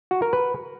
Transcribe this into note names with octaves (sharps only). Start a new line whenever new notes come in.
F#4
A#4
B4